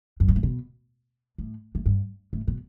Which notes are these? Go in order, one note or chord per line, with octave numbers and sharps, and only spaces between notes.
F#2
G2
A2
B2
A2
A2
G2
A2
B2